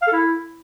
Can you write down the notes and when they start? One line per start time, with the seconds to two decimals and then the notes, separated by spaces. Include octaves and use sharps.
0.02 F5
0.07 A4
0.13 E4